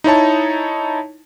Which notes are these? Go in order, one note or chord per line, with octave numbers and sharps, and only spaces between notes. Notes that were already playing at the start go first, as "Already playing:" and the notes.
D#4 E4 C#5 A5